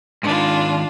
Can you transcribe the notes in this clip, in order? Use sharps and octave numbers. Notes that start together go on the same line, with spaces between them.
G#2 D#3 D4 F4